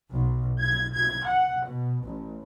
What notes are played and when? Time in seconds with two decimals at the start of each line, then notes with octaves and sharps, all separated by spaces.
0.11 B1
0.61 G#6
0.93 G#6
1.26 F#5
1.66 B2
2.04 A1